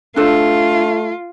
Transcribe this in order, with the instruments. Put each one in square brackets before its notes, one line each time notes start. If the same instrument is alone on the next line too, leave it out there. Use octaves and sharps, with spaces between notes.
[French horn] A3 [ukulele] D4 A4 C5 [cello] F4